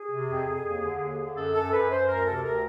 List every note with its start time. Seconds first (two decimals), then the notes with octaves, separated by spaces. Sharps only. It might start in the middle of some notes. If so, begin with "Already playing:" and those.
Already playing: G#4
0.10 C3
0.29 F2
0.47 F2
0.65 D#2
0.83 D3
1.00 D#2
1.18 D3
1.36 F#2 A4
1.54 F#2 A4
1.71 F#2 B4
1.90 F#2 C5
2.07 D2 A#4
2.26 C3 A4
2.44 D2 A#4